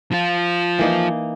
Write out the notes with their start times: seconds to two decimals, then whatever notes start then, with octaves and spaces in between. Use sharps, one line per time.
0.12 F3 F4
0.79 E3 A#3 D#4